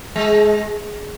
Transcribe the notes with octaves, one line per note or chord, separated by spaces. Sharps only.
G#3